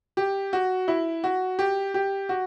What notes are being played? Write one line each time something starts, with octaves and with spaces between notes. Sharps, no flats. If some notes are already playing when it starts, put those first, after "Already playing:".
G4
F#4
E4
F#4
G4
G4
F#4